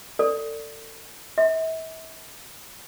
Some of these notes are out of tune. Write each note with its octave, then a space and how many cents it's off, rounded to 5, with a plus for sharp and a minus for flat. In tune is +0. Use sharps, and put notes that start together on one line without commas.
A4 +35 D5 +0
E5 -35 C6 +0